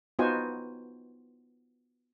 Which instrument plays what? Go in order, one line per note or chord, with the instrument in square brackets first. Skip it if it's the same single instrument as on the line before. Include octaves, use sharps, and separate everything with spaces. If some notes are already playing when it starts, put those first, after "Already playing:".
[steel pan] B3 D#4 F4 F#4 C5 G#5